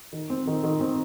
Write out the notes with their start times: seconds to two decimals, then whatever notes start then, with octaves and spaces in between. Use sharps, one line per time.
0.13 D#3
0.30 C4
0.47 D#3
0.64 D#3
0.80 C4